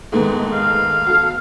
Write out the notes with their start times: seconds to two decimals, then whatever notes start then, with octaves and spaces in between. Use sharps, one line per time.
0.12 G#2 D#3 G#3 A3 B3
0.53 F5
1.07 B3 F#4 A4